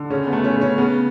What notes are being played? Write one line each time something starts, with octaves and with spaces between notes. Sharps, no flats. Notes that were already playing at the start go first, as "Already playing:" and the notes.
Already playing: D3
C#3 C#4
B3
A3
C#4
C#3
C#4
C#3 B3